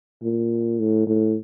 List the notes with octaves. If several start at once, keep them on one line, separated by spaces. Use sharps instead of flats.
A#2
A2
A2